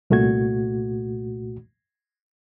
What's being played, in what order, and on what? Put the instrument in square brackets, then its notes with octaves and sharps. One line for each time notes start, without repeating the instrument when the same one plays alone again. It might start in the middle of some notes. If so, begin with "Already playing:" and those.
[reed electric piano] C2 A#2 A3 F#4 G#6